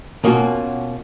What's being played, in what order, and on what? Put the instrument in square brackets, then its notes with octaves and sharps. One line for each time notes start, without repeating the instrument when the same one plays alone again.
[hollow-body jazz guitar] B2 A#3 C#4 F4 F#4